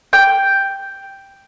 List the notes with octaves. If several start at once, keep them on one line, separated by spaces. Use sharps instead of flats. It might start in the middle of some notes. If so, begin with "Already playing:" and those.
G5